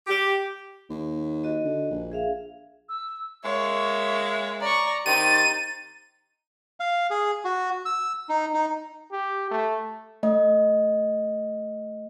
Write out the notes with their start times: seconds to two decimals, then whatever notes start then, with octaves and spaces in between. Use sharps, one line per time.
0.07 G4
0.90 D#2
1.44 F#4 D#5
1.64 D3
1.91 A#1
2.12 G#4 E5 F5
2.89 E6
3.44 G#3 A#3 C#5 E5 C#6
4.61 D5 A#5 C#6
5.06 D#3 C4 D#4 G4 A6 D#7
6.80 F5
7.11 G#4
7.45 F#4
7.86 E6
8.29 D#4
8.54 D#4
9.12 G4
9.51 A3
10.23 A3 D#5